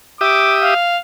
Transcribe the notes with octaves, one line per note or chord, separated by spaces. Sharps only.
G4 E5 D6 D#6
F5